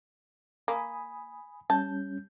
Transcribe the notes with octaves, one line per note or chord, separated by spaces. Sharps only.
A#3 G#5 B5 D#6
G3 C#4 A5 G6